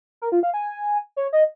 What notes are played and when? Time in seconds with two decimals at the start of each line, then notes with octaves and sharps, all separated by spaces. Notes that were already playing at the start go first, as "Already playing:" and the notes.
0.22 A#4
0.32 F4
0.43 F5
0.54 G#5
1.16 C#5
1.33 D#5